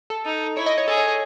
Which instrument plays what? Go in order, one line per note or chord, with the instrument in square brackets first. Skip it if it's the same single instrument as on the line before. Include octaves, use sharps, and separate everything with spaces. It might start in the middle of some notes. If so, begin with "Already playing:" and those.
[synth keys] A4
[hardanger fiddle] D#4
[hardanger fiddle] E4 [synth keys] C#5
[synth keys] D#5
C#5
[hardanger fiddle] G#4 [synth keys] A4
[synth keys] C#5
D#5